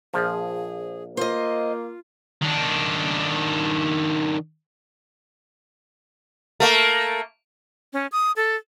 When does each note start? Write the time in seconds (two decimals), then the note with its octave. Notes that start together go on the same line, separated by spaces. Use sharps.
0.14 A#1 F3 G#4
1.17 A#3 F4 C5 D#5
2.42 D#3 D4
6.60 A3 A#3
7.93 C#4
8.12 D#6
8.36 A4